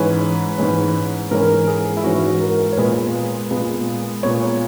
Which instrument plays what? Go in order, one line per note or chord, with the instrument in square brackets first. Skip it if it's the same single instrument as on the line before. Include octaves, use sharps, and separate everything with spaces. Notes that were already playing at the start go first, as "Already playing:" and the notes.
Already playing: [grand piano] G#2 E3 G#3 C#4 B4
G#2 E3 G#3 C#4
G#2 E3 G#3 C#4 A#4
G#4
E4
G#2 E3 G#3 C#4 F#4
A#4
C#5
A#2 G#3 B3 B4
A#2 G#3 B3
A#2 G#3 B3 C#5